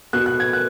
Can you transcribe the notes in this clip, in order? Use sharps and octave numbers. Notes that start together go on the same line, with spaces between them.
B2 F#6
F#6
G#6
F#6